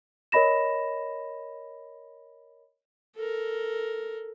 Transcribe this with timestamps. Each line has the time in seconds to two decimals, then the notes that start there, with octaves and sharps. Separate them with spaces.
0.32 A#4 C#5 D#5 B5 A#6 E7
3.16 A4 A#4